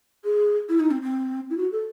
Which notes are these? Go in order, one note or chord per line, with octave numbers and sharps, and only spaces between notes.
G#4
E4
D#4
C4
C4
E4
F#4
A4